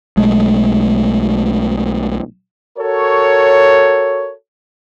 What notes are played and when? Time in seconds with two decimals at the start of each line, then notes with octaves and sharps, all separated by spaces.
0.17 B1 G#3 A3
2.79 F#4 A4 A#4 C#5